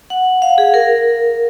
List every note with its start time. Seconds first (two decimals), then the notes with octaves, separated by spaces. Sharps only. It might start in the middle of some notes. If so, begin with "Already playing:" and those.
0.10 F#5
0.42 F5
0.58 G#4
0.74 A#4